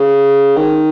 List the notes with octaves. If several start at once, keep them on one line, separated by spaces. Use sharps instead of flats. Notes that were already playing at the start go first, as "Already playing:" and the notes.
Already playing: C#3
D#3